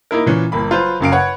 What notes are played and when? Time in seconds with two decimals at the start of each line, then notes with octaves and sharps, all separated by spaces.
0.11 A#3 D#4 E4 A#4
0.26 A#2 E3 C#4
0.52 G1 A#3 B5
0.70 F#3 F4 B4 C5
1.00 F#1 F#2 F5 D7
1.12 B4 C#5 F#5